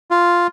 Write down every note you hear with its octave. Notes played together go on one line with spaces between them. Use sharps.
F4